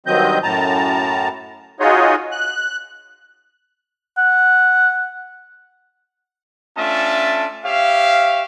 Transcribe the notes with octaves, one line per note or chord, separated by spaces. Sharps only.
G2 D#3 F#3 C4 D#5 G6
F#2 A2 A5 A#5
D#4 F4 F#4 G#4 C#5 D#5
F#6
F#5
A3 C#4 D4 F4 E5 A5
G4 C#5 E5 F5